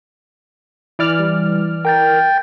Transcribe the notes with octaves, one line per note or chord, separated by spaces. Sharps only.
E3 D5 F6
G3
A#4 G5 G6 A6